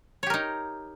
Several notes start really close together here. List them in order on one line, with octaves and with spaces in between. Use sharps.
C#5 G4 A#4 D#4